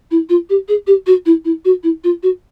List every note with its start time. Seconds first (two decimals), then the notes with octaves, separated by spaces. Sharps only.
0.11 E4
0.29 F4
0.50 G4
0.68 G#4
0.87 G4
1.07 F#4
1.26 E4
1.45 E4
1.65 F#4
1.83 E4
2.04 F4
2.23 F#4